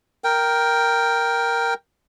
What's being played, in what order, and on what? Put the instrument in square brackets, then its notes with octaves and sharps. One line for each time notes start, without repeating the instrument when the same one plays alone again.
[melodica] A#4 G5